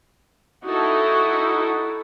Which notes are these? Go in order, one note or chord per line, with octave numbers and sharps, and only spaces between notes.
D#4 E4 F#4 A4